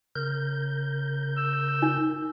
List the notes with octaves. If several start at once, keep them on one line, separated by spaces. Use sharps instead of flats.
C#3 A#4 G6
E6
D#4